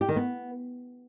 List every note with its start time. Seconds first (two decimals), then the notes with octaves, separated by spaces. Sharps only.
0.01 G4
0.09 D#3
0.16 B3